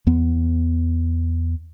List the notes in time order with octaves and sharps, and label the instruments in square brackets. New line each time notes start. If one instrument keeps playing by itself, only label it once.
[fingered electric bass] E2 B3